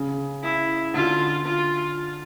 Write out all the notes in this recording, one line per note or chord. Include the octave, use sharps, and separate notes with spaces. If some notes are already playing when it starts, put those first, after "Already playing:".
Already playing: C#3
E4
D3 F4
F4